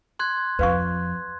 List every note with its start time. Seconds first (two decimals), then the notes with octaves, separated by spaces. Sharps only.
0.19 C6 F#6 G#6
0.59 F2 F3 B4 F5 C#6